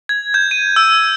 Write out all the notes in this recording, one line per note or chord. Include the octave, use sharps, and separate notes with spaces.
G#6
G6
D#7
E6